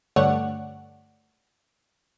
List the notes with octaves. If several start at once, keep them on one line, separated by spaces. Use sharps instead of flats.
G2 D3 A3 C#5 D5 F#5